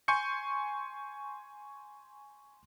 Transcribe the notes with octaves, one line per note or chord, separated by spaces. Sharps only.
G#5 C6 C#6 G6 C#7